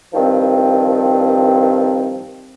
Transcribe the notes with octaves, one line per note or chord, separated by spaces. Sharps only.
C2 G2 D#3 F3 C4